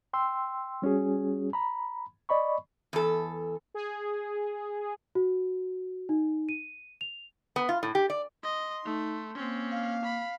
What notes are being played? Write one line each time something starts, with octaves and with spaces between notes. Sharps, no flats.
G5 C6 E6
G3 C#4 F#4 G#4
A#5 B5
D5 D#5 B5 C#6
E2 A4
G#4
F#4
D#4
D#7
F7
B3
F4
A2
G4
D5
D#5 C6
A3 D#4
A#3 C4 C#4
F5
B5